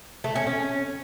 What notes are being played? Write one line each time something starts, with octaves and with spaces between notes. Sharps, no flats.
A3
C#4
C#4